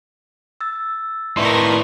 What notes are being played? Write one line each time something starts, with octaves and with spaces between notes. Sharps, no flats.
E6 A6
A2 D#3 A#4 B4 D5 E5 C6 C#6